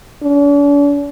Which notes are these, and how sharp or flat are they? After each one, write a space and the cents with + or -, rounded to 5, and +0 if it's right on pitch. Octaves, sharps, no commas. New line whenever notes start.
D4 -45